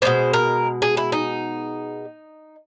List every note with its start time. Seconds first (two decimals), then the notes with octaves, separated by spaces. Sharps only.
0.02 B2 G#3 B3 C5
0.33 A#4
0.82 G#4
0.97 E4
1.12 D#4